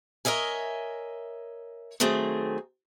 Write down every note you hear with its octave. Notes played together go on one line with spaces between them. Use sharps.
A#4 C#5 D#5 E5 G#5
D#3 F#3 A3 C4 G#4